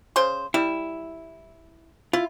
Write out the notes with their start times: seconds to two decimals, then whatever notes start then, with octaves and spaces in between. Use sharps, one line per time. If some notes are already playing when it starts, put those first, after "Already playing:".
0.16 C#3 C5 C6
0.54 G3 E4
2.13 E4 F4